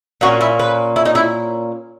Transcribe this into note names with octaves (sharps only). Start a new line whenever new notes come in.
A#2 A#3 C#4 F#4
E4
B4
E4
D#4
E4